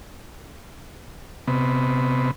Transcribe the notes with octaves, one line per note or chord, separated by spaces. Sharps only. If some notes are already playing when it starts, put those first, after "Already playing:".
C3 B3